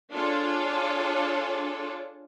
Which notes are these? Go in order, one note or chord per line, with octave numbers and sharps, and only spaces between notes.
D4 F4 G#4 A4 C#5